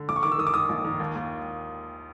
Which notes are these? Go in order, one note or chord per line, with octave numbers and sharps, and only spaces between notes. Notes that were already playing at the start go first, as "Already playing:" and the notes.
Already playing: D3
A#1 D6
C#6
D#3 D6
E6
D#3 D#6
D6
D#3 D#6
A#1
D#3
D#2
D#2